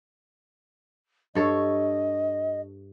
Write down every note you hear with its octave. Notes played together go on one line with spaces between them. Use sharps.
G2 A4 C#5 D#5